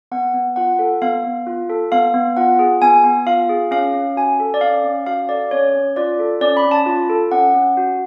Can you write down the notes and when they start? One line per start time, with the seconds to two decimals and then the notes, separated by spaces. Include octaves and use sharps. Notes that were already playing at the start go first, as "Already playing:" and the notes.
0.12 B3 F#5
0.34 B3
0.56 F4 F#5
0.79 A4
1.02 B3 F5
1.24 B3
1.47 F4
1.70 A4
1.92 B3 F5
2.14 B3
2.37 F4 F#5
2.59 G#4
2.82 B3 G#5
3.04 B3
3.27 F4 F5
3.49 G#4
3.71 C#4 F5
3.94 C#4
4.16 F#4 G#5
4.40 A4
4.54 D5
4.61 C#4 F5
4.84 C#4
5.06 F#4 F5
5.29 A4 D5
5.51 C#4 C#5
5.74 C#4
5.96 F4 D5
6.19 A4
6.41 C#4 D5
6.57 B5
6.64 C#4
6.71 A5
6.86 F4
7.09 A4
7.32 C#4 F#5
7.54 C#4
7.77 F#4